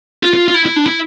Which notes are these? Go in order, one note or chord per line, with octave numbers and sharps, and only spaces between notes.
F4
F4
F4
E4
E4
D4
E4